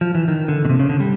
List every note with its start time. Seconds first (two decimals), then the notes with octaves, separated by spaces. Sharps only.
0.01 F3
0.15 E3
0.28 D#3
0.48 D3
0.65 B2
0.69 C3
0.79 C#3
0.89 D3
1.00 G3